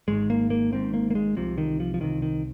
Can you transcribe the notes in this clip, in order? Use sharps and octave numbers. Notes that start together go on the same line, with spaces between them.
G#1 G#2 G#3
A#3
A#3
G#1 G#2 C4
A#3
A#3
G#3
C2 C3 F3
D#3
F3
F3
C2 C3 D#3
D#3